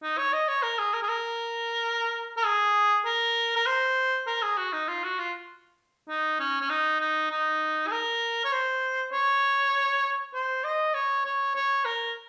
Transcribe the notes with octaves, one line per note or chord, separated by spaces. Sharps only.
D#4
C#5
D#5
C#5
A#4
G#4
A#4
G#4
A#4
A#4
G#4
A#4
A#4
C5
A#4
G#4
F#4
D#4
F4
F#4
F4
D#4
C#4
C#4
D#4
D#4
D#4
G#4
A#4
C#5
C5
C#5
C5
D#5
C#5
C#5
C#5
A#4